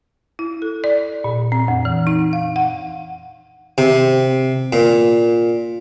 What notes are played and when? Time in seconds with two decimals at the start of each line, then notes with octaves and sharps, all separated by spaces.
0.39 E4
0.62 A4
0.84 D5
1.24 A#2
1.52 C4
1.68 F2
1.85 E3
2.07 D#4
2.33 F5
2.56 F#5
3.78 C3
4.73 A#2